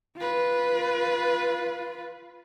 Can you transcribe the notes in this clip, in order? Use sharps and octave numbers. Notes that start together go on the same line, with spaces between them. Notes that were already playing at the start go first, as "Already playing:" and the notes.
F4 B4